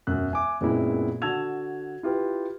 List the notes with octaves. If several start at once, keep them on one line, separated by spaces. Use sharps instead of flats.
E1 F#2 F#6
E5 G#5 D6
F#2 A#2 G#3 B3 C4 E4
D3 F#4 A5 E6 G#6 F7
E4 F4 G4 B4